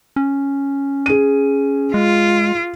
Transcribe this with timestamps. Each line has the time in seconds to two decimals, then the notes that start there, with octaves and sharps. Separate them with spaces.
0.16 C#4
1.06 G#4 D#7
1.94 G#3 F4